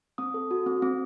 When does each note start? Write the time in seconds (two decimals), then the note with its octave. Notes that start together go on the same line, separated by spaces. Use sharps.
0.18 C4 D#6
0.34 A4
0.51 F#4
0.66 C4
0.82 C4